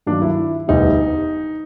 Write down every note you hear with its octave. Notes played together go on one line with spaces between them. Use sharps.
G2 D#3 F#3 A#3 D4
E4
E1 D2 D3 G3 B3 D#4